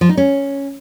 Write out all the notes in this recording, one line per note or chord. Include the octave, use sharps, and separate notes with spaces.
F3
D#4
C#4